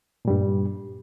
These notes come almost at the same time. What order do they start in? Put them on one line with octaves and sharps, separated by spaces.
A#2 G3 G2